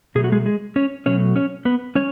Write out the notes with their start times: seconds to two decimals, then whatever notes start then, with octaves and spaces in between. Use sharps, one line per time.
0.15 B2 F#3 A3 G#4
0.24 F#4
0.32 G#3 G#4
0.46 G#3 G#4
0.76 C#4 C#5
1.06 B2 F#3 A3 C#4 C#5
1.36 C#4 C#5
1.65 B3 B4
1.95 G#3 C#4 C#5